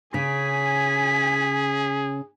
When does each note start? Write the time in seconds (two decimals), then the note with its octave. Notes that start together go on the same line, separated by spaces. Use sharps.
0.14 C#3 G#4 G#5 B6